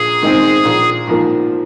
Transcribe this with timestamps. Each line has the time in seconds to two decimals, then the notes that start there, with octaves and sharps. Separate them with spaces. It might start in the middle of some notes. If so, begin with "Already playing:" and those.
Already playing: A#1 G#4
0.22 G#2 D#3 G#3 C4
0.65 A#1
1.07 G#2 F3 A#3